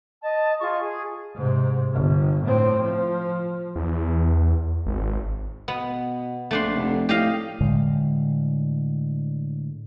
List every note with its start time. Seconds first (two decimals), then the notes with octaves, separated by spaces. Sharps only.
0.23 D#5 A5
0.60 F4 G#4 D#5 C#6
0.79 G#4
1.35 G#2 C3
1.94 G1
2.44 A2 C4
2.83 F3
3.76 E2
4.86 G#1
5.68 B2 B3
6.51 A#1 A3 D4 C6
6.75 F1
7.09 A2 G4 D#5 F5
7.61 A2 D3 G#3